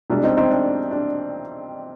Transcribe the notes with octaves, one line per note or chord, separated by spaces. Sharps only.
C2 B2 G#3 D4
C4 D#4
C4 D#4
D4
D4